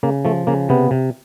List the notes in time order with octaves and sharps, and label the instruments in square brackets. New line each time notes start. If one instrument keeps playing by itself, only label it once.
[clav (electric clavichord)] C#3 A#3
F3 A3
C#3 A#3
C3 B3
C3